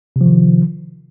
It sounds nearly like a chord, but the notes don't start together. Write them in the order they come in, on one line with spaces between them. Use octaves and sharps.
C3 F3 D#3